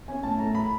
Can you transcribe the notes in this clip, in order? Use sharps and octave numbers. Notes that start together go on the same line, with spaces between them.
C#4 G#5
A2 A5
A3 A#5
B5